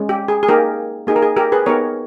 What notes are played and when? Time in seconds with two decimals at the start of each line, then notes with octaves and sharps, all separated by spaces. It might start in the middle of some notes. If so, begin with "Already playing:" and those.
Already playing: G#3 C#4
0.09 G4
0.28 G#4
0.43 G#4
0.48 A#3 D#4 G4 A#4
1.07 A#3 D#4 G4 G#4
1.16 A#4
1.22 G#4
1.37 G4 A#4
1.52 G#4 B4
1.66 B3 D#4 G4 A#4 C#5